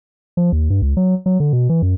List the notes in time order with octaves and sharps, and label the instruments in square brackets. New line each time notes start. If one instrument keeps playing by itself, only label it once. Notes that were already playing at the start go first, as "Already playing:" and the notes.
[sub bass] F3
D#2
G2
C#2
F#3
F#3
D3
B2
E3
F#2